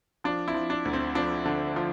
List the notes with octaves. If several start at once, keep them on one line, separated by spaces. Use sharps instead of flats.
F3 D4
C4 E4
F3
D4
D2
C4
F3 D4
D3
F3